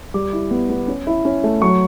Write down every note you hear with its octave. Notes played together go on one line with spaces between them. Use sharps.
G3 D6
E4
B3
B3
C#4
E4
C#4
A3
F#3 C#6